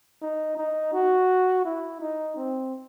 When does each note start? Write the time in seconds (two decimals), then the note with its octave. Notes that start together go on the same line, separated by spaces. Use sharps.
0.22 D#4
0.57 D#4
0.93 F#4
1.65 E4
2.01 D#4
2.36 C4